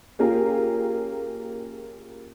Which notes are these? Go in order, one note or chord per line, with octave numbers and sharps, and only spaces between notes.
A#3 C#4 F4 G4 G#4 A#4